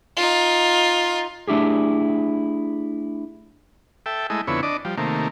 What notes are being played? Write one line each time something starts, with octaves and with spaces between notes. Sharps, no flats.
D#4 F4
A3 D4 E4 G4 G#4
A4 E5 G5
G#3 A3 E4 D#5
F2 D3 B3 E4 C#5
D4 D5 D#5
F3 G3
C3 D#3 A3 A#3